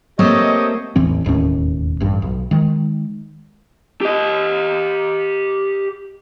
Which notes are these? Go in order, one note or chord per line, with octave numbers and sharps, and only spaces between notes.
A3 A#3 C4 G4 C#5 D#5
A1 E2 E3 C4
E1 D#2 A2 C#4
A1 G2
B1
D#3 G#3
G4 D#5